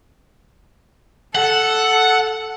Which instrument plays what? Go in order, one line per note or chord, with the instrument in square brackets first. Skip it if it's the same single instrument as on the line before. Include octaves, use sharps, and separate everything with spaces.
[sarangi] A4 [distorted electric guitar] F#5